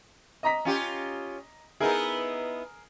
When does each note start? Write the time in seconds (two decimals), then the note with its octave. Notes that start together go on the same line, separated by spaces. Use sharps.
0.43 D#5 A#5 B6
0.65 C#4 F4 G4
1.80 B3 D#4 E4 G#4 A#4